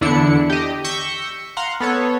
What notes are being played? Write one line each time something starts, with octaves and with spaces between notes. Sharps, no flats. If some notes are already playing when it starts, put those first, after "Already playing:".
E2 D3 D4 E4 C#7
G4 D#5
C#6 E6 G6 A#6 B6 C#7
F5 F#5 A#5 C6
B3 A4 C#5